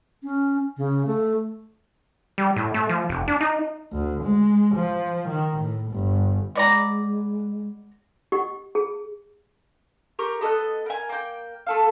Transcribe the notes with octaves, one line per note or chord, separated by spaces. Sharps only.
C#4
C#3
A3
G3
A2
A3
F3
F1
D4
D#4
D2
G#3
F3
D#3
A2
G1
B2 G#3 D5 A#5
G4
G#4
G4 A#4 C#6
B3 A4 D#5 F#6
A#4 G#5
A#3 G5
A3 A4 F5